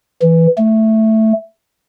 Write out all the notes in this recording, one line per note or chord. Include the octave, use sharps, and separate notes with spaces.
E3
A3